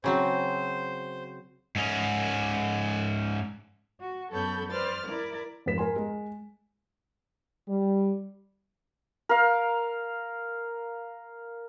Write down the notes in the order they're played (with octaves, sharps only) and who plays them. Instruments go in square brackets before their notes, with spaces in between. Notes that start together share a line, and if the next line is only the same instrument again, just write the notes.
[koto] C#3 F#3 C4 [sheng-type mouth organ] C5
[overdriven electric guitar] G#2 C#4
[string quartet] F#4
F#2 B3 A4 C#5 B5 G6
B4 C5 D5 F6 A6
E4 A#4 D5
[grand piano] F2 G#2 A#4 B4 B6 E7
A#4 G#5 C6
G#3
[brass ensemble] G3
[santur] A#4 F5